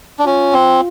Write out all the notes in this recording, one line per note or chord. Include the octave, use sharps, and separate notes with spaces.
D4
C#4 F4
C4